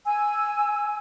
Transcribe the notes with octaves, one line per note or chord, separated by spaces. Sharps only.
G#5 E6